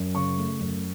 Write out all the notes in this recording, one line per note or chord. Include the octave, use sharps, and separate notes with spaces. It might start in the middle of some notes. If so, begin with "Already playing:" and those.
Already playing: F#2
C#3 C#6
A3
F#2